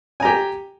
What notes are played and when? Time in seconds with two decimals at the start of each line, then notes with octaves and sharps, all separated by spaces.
0.20 G#5
0.22 A#5
0.25 G4